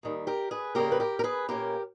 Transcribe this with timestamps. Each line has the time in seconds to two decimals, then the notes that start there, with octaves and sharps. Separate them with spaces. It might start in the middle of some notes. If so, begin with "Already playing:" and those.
0.03 D#2 D#3 G3
0.27 G4 A#4
0.51 G#4 B4
0.75 E2 C#3 G3 A#3 G4 A#4
0.92 B4
1.00 G4 A#4
1.19 A#4
1.24 G#4 B4
1.49 A#2 A#3 C#4 G4 A#4